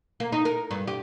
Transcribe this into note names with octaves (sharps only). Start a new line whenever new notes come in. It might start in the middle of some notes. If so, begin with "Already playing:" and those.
A#3
D#4
A#4
G2
G4